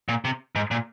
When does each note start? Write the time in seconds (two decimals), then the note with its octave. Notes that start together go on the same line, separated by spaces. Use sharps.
0.09 A#2
0.25 C3
0.56 G#2
0.71 A#2